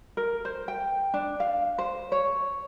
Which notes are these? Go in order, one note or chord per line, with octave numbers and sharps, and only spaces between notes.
A#4
C5
G5
D4
F5
C5
C#5